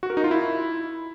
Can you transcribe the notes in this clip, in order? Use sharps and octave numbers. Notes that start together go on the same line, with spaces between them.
F#4
A#4
D#4
F4
E4